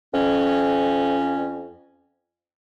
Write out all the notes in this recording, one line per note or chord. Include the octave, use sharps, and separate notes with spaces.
F2 C#4